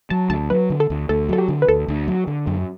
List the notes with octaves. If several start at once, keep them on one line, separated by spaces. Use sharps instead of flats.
F#3 A5
D2 A5
F#3 B4
D3
A4
D2
D2 A4
F#3 A4
G4
D3
B4
D2 A4
D2
F#3
D3
F#2